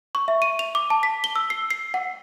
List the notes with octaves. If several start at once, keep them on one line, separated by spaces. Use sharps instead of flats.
C#6
E5
D#7
F7
D6
A5
B6
G7
E6
C7
C7
F#5